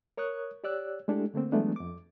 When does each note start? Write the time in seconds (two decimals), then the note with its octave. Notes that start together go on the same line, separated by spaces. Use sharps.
0.17 A#4 C#5 C#6 D#6 F#6
0.64 G4 C#5 D5 E6 F#6
1.08 G#3 A3 D4 E4 G4 A4
1.34 D3 A3 A#3 C4
1.52 E3 F#3 G#3 A3 B3 D4
1.76 F2 D6